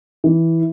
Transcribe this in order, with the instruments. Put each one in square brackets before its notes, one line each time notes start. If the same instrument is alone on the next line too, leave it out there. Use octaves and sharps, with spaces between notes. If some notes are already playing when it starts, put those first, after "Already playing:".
[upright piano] E3